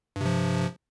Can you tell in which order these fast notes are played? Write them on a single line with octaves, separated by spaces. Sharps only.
G2 C3 F3